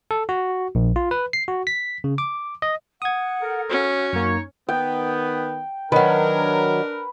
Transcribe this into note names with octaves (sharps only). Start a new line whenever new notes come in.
A4
F#4
A#1
F4
B4
C7
F#4
B6
C#3
D6
D#5
F#5 D#6 G#6
A4 A#4
C#4 F#4
F#2 A#3 D#4 C#5
D#3 B3 G5
D#3 F#3 D4 A#4 B4